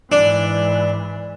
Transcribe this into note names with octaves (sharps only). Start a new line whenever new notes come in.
G#2 E3 D4